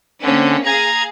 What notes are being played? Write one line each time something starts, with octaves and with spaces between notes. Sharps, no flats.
D3 A#3 C4 C#4
G#4 F5 A#5 G#6